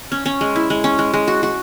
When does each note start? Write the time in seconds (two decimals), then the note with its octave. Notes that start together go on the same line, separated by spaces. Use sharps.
0.12 C#4
0.26 C#4
0.41 G#3
0.56 E4
0.70 G#3
0.84 C#4
0.99 G#3
1.13 G#3
1.28 F#4
1.43 F#4